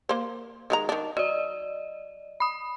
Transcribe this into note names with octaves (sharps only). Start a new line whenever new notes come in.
A#3 C5
D#3 G#3 A#5
D#3 D4
F#3 D5 D#5
B5 D#6